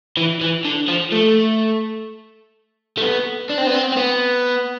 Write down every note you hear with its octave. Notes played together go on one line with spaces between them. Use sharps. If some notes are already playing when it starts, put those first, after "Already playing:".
E3
E3
D3
F3
A3
A3
B3
D4
C4
B3
C4
C4
B3